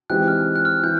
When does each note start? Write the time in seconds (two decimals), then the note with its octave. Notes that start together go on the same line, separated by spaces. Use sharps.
0.10 E3 G#3 C4 D#4 G4 F#6
0.28 F6
0.56 F#6
0.65 F6
0.83 E3 G6